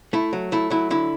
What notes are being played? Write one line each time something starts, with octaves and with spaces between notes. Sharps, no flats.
A3 E4
F#3
A3 E4
F#3 E4
D3 E4